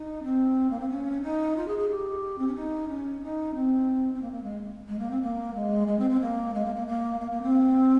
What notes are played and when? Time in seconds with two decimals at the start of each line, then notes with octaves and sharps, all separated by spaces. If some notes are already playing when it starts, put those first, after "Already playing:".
Already playing: D#4
0.23 C4
0.70 A#3
0.80 C4
0.89 C#4
1.22 D#4
1.56 F4
1.67 G#4
1.78 G#4
1.89 G4
2.38 C4
2.47 C#4
2.55 D#4
2.88 C#4
3.22 D#4
3.54 C4
4.14 C4
4.22 A#3
4.32 A#3
4.43 G#3
4.88 G#3
4.99 A#3
5.10 C4
5.21 A#3
5.54 G#3
5.87 G#3
5.98 C4
6.10 C4
6.20 A#3
6.54 G#3
6.65 A#3
6.75 A#3
6.87 A#3
7.20 A#3
7.31 A#3
7.42 C4